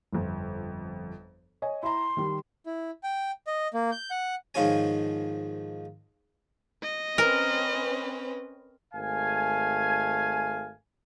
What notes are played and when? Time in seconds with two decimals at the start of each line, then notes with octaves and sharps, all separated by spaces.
0.13 G1 F2
1.62 C#5 D#5 G#5
1.83 E4 A#5 C6
2.17 D#3 G3
2.66 E4
3.03 G5
3.47 D#5
3.74 A#3
3.91 G6
4.11 F#5
4.54 G#2 D#3 F3 F4 C#5 G#5
6.83 D#5
7.18 C4 C#4 A#4 B4
8.94 G#1 A3 F5 G#5